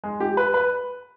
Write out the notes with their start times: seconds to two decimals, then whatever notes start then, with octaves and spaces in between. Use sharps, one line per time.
0.04 G#3
0.20 G4
0.37 B4
0.54 B4